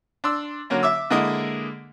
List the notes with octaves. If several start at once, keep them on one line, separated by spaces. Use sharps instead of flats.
D4 C6 E6
D3 F#3 A#3 C#4
E5 D6 E6
D3 G#3 A#3 E4 D#5